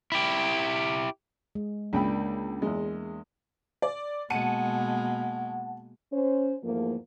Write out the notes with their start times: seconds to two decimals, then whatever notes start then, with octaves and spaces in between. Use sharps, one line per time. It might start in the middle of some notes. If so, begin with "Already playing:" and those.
0.12 E4 G4
1.55 G#3
1.93 C#2 A#3 D4 G5 B5
2.62 E2 G#3
3.82 D5
4.30 B2 G#3 A#3 F#5 A5 C#7 D#7
6.12 C#4 C5
6.64 E2 G#2 F3 A3 A#3